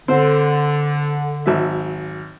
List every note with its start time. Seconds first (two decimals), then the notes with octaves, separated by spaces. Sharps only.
0.08 D3 C4 C5
1.46 G#1 F#3 E5